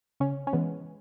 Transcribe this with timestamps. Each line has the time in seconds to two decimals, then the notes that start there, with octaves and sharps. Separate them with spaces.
0.20 C#3 C#4
0.47 C#4
0.53 E3 G#3 B3